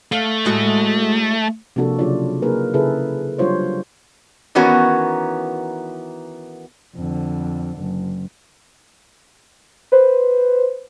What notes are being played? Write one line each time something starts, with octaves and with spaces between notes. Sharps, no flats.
A3 F5
A2 G#3 F#4
C3 F3 A#3 D4 F#4 A4
C#3 F#3 D4 F4 D5
A#3 D#4 G#4 A#4 B4
C#3 E4 G#4 A4 B4
F#3 G3 D4 F4 C5 C#5
D#3 E3 B3 C#4 F#4 A#4
F2 D3
F#1
B4 C5